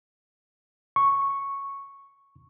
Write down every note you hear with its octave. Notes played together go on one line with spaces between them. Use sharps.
C#6